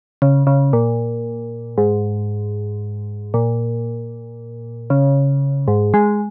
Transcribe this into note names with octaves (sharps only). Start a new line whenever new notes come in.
C#3
C#3
A#2
G#2
A#2
C#3
G#2
G#3